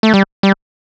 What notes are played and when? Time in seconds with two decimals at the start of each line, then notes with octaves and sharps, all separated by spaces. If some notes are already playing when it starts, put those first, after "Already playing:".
0.03 A3
0.14 G3
0.43 G3